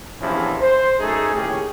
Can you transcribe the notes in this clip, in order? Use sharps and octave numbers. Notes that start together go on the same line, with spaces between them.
A#1 E2 C3 F3 C#4 E4
C5
F#2 A3 D#4 G#4
D#2 A2 C#4 G4 G#4